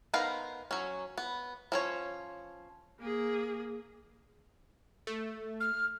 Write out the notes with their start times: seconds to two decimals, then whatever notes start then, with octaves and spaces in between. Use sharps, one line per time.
0.14 B3 D#4 A#4 C5 F5
0.71 F#3 C#4
1.18 B3
1.72 F3 C#4 C#5
2.99 A#3 G#4
5.07 A3
5.60 F6